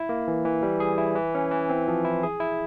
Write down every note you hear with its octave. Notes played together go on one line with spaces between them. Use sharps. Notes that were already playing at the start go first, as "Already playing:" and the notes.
Already playing: E4
A#3
E3
E3
G3
G#4
E4
E3
C#4
E3
C4
F3
E4
G#4
E4